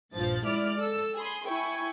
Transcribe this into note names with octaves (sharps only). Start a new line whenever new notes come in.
A#1 G2 F3 A6
G#3 E4 D5 F6
A4 E6
G#4 B5 C6
E4 G5 G#5 C#6